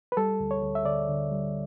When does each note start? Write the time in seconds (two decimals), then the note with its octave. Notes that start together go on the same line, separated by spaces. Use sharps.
0.12 B4
0.17 G3 A4
0.40 D2
0.51 C#5
0.62 D2
0.75 E5
0.85 D3 D5
1.09 D3
1.32 G3